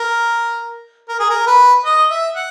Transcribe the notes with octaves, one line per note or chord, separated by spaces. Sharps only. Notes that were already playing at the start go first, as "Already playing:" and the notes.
Already playing: A#4
A#4
G#4
A#4
B4
D#5
E5
F#5